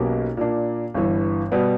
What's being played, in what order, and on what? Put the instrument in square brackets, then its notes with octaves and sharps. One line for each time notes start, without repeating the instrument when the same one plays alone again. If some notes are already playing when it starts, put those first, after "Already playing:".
Already playing: [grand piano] B1 B2 A#3 C#4 G4
A#2 A#3 D4
G1 G2 E3
B2 G3 B3